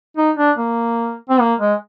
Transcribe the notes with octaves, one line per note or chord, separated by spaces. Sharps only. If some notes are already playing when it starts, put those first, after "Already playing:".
D#4
D4
A#3
C4
A#3
G#3